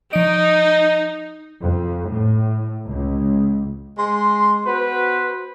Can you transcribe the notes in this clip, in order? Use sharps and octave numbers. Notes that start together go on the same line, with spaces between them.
F3 D#4 D#5 D7
F2
A2
C#2
G#3 C6
B3 F#4 B4 C5